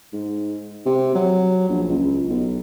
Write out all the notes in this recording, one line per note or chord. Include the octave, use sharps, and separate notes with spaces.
G#2
C3
F#3
A#1
C#2
B1